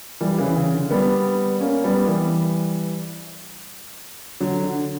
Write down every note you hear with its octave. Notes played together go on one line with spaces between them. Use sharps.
E3 G3
C#3 E3
C#3
D3
G3 B3
A#3 C#4
G3 B3
E3 G3
D3 F#3
D3